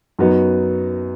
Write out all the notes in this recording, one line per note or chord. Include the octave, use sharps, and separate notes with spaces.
F#2 F#3 B3 D#4 F#4